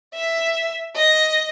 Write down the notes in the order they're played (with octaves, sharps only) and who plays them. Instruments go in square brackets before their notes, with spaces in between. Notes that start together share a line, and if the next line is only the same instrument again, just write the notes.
[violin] E5
D#5